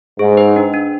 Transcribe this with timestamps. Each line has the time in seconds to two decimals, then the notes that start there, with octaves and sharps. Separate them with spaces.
0.19 G#2 G#4
0.37 B4
0.56 D4
0.73 D4